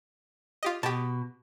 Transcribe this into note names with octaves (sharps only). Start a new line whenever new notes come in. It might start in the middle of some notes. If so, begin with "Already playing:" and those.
F4 G4 D#5
B2 G4 A5